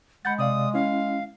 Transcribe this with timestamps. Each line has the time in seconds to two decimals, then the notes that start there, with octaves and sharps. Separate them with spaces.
0.25 G#3 F#5 B5 G6 A6
0.39 C3 D5 F5 D#6
0.74 C#4 E4 F5